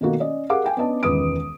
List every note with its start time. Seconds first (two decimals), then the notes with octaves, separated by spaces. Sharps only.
0.01 B2 D#3 A3 A#3 F#4
0.20 C#4 D5 D#5
0.49 G4 G#4 A#4 F5 F#5 D6
0.64 F5 G5 G#5
0.77 B3 C#4 D4 B4 D#5 A5
1.03 E1 C#2 D#3 B4 D#6 D7